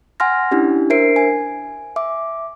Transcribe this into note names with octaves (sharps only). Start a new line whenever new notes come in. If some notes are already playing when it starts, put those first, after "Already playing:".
F#5 G#5 C6 F6 A#6
C#4 D4 E4 G4
D4 A#4 C5 E5 C7 D7
G#5
E5 D6